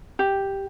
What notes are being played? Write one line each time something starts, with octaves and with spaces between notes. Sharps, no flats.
G4